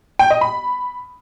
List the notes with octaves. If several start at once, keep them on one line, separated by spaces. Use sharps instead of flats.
G5
D#5
B5